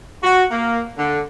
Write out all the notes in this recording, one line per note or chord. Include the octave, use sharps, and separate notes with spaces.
F#4
A#3
D3